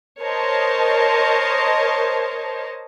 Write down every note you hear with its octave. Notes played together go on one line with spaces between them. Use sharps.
A#4 C5 C#5 D#5 A5